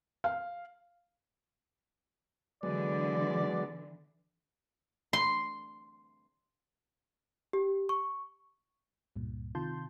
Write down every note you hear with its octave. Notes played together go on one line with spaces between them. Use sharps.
F5
D3 E3 F#3 G#3 B3 D5
C6
G4
C#6
C#2 G2 A#2
C3 D#3 F4 A5 C6 G6